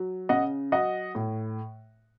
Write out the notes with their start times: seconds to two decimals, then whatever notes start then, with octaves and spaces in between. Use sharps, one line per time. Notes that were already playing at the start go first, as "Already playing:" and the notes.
Already playing: F#3
0.29 C#3 D#5 F#5
0.72 F#3 D#5 F#5
1.15 A2